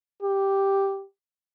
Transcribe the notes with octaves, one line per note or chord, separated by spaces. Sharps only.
G4